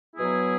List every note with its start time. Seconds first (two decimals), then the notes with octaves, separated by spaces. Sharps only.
0.15 B2 F#3 B3 E4 G#4